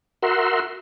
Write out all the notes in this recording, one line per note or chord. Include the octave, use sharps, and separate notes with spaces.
F#4 A#4 E5 F#5 C6